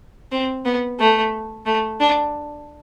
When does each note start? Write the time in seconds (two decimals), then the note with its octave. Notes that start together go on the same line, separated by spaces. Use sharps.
0.32 C4
0.65 B3
1.00 A3
1.66 A3
2.00 D4